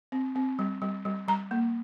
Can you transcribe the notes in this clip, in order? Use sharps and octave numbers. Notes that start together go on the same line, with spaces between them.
C4
C4
G3
G3
G3
G3 A#5
A#3